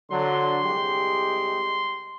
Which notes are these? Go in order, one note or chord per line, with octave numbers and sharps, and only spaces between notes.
D3 F#3 C6
C2 G#3 G4